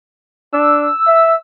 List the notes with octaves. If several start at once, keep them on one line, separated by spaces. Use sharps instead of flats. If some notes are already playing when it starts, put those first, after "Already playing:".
D4 E6
E5